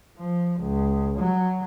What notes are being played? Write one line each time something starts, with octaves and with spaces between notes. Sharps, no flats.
F3
C#2
F#3